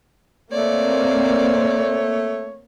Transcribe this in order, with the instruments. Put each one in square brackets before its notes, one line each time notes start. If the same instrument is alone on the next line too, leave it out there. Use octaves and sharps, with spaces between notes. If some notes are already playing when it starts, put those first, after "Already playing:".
[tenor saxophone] A3 [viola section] A#3 C4 [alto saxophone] C#5 [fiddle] D5